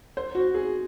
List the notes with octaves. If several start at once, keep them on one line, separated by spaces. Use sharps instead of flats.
C5
F#4
G#4